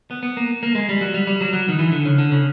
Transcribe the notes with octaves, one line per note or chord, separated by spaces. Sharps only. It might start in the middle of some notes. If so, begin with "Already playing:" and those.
B3
B3
A#3
A#3
G#3
G3
F#3
G3
G3
F#3
F#3
D#3
E3
D3
C#3
D3
C#3